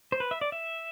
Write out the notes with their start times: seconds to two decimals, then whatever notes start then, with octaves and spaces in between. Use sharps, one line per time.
0.12 C5
0.20 B4
0.31 E5
0.41 D5
0.52 E5